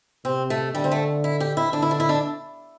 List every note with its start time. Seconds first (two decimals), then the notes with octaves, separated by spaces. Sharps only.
0.25 C3 C4
0.50 A3
0.75 D3 G3
0.84 C4
0.91 A3
1.24 E4
1.40 G4
1.57 E4
1.73 D3 D4
1.82 E4
1.91 D4
2.00 E4
2.09 D4